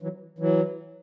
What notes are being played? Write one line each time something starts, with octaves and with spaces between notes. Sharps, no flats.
E3 F#3
E3 F#3